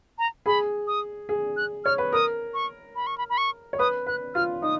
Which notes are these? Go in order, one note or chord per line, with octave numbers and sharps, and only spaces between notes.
A#5
G#4 B5
D#6
G#4
F#6
C#5 F6
B4
A#4 D#6
C#6
B5
C#6
B5
B5
C#6
C#5
B4 D#6
B4 F#6
F4 F6
D#4 D#6